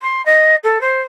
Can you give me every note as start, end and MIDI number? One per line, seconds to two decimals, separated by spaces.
0.02 0.24 84
0.25 0.55 75
0.63 0.81 69
0.81 1.00 72